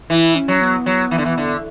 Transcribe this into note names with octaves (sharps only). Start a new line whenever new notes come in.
E3 E4
C#4
F#3
B3
F#3
E3
D3
E3
D3